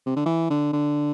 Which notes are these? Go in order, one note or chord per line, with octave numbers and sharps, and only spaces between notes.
C3
D3
E3
D3
D3